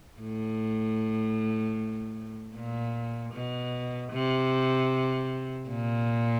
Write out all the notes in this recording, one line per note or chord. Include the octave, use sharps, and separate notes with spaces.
A2
A#2
B2
C3
A#2